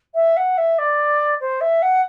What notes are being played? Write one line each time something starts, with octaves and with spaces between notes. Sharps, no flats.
E5
F#5
E5
D5
C5
E5
F#5